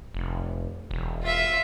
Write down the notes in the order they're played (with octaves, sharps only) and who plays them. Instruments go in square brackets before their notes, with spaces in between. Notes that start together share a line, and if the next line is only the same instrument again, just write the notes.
[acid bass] F1
E1
[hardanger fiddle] F4 E5